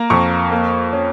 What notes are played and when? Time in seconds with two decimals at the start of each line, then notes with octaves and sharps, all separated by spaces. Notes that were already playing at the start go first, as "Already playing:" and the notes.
Already playing: A#3 A#5
0.10 F2 C#6
0.51 A#3
0.93 C#4